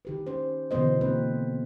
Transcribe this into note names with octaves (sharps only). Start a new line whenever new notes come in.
D#3 G4 B4
C#4 C5
B2 D3 E3 B3 C5 D#5
A#3 C4 B4